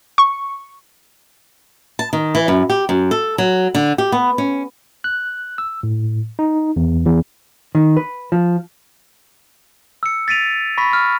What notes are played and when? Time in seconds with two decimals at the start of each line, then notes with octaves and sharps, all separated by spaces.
0.18 C#6
1.99 A5
2.13 D#3
2.35 E3
2.48 F#2
2.70 G4
2.89 F#2
3.11 A4
3.38 F#3
3.75 D3
3.98 G4
4.12 B3
4.38 C#4
5.04 F#6
5.58 E6
5.83 A2
6.39 D#4
6.76 E2
7.06 E2
7.75 D#3
7.97 B4
8.32 F3
10.03 E6 C#7
10.28 A6 B6 D7 D#7 F7
10.78 B5 C#6 A#6 B6
10.93 F6